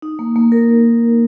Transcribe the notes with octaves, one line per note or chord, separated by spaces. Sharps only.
D#4
A#3
A#3
A#4